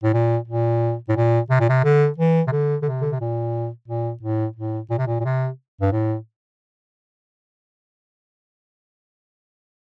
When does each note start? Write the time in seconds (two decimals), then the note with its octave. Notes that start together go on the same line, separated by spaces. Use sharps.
0.03 A2
0.14 A#2
0.48 A#2
1.08 A2
1.16 A#2
1.50 C3
1.60 A#2
1.69 C3
1.84 D3
2.18 E3
2.47 C3
2.52 D3
2.82 D3
2.86 C3
3.01 D3
3.11 C3
3.21 A#2
3.88 A#2
4.22 A2
4.56 A2
4.90 A#2
4.98 C3
5.07 A#2
5.20 A#2
5.25 C3
5.81 G2
5.92 A2